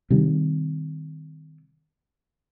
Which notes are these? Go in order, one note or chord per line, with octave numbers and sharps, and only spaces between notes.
C3 D#3 G3